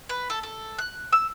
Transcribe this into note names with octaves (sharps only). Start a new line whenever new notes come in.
B4
A4
A4
F#6
E6